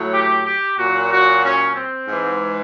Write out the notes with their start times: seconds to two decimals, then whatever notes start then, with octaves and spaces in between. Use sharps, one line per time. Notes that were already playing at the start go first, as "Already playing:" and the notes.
Already playing: A2 F#3
0.12 G4
0.45 G4
0.77 A#2 F#3 F#4
1.11 F#4
1.44 C#4
1.75 C4
2.08 G#2 E3